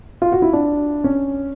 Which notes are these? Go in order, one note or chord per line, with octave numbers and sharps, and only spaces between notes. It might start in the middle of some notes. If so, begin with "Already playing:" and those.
F4
F#4
E4
D4
C#4